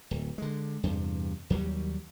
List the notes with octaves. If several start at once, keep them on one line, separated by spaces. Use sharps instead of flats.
D1
D3 G#3
E2 G2 C3
D#2 F#3 G3